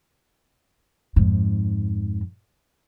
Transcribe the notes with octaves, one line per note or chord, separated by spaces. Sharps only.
F2 G#2